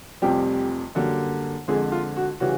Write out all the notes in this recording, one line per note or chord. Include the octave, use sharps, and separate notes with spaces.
F1 F2 C3 G3 G4
F#2 D3 G3 A#3
F2 D3 F3 G#3 G#4
F4
F#4
C#3 E3 G3 F#4